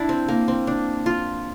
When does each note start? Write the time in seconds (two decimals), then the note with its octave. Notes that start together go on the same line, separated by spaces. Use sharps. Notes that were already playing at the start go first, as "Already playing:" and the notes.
Already playing: D4 E4
0.09 C4
0.28 A#3
0.48 C4
0.67 D4
1.06 F4